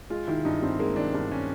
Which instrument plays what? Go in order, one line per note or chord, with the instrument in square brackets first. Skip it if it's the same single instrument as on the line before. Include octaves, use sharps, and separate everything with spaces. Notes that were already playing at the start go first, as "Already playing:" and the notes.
[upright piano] G#3 [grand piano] F4
[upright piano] D#3 [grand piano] E4
[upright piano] G2 [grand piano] D#4
[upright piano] G2 [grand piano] C4
[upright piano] G#3 [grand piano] A#3
[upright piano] D#3 [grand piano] D4
[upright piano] G2 [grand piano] D4
[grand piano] C#4